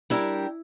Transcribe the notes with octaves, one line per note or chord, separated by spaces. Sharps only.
G3 D4 E4 G4 A#4